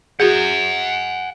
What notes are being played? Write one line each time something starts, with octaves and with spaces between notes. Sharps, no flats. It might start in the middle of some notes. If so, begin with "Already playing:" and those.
F#4 G#4 F#5 G#5